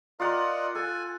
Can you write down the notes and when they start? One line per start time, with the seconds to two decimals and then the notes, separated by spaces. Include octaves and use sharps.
0.20 F4 A#4 D5 D#5 F#5 A#5
0.75 A4 G#5